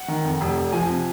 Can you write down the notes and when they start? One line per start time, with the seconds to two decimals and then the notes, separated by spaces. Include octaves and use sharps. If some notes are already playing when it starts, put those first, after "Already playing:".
Already playing: F#5
0.08 D#3
0.25 F2
0.41 F1
0.57 F1
0.73 F3 G#5
0.89 C3